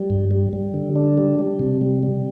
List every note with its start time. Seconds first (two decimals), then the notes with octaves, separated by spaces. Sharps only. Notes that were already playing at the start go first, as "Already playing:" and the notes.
Already playing: G3
0.10 G2
0.31 G3
0.53 G3
0.74 D3
0.96 D4
1.17 G3
1.39 G3
1.59 C3
1.81 G3
2.03 G3